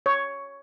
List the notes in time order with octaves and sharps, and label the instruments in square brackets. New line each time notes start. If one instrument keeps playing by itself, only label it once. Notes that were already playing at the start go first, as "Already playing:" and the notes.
[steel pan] C#5